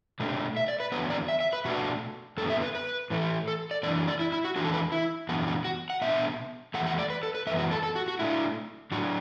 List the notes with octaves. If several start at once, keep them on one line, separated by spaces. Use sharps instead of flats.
B2 A3 D4
E5
D5
B4
E2 D3 F#3 B3 B4
D5
E5
E5
B4
B2 A3 D4 F#4
F#2 D3 B3 A4
E5
B4
B4
A2 E3 A3
A4
D5
F#2 E3 D4 D5
D5
E4
E4
F#4
E2 E3 D4 F#4
A4
B4
E4
F#2 E3 B3 D4 F#4
F#4
F#4
F#5
B2 B3 D4 E5
E2 E3 A3 F#5
F#5
D5
B4
A4
B4
F#2 E3 B3 E5
F#4
A4
A4
F#4
F#4
A2 A3 D4 E4
A2 F#3 A3 D4 F#4